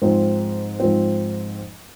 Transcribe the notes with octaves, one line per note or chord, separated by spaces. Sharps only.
G#2 F3 C4
G#2 F3 C4